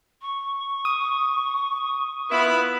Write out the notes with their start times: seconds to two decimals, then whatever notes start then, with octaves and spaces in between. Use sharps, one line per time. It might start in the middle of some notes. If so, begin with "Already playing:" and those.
0.21 C#6
0.85 D#6
2.31 B3 E4 F4 B5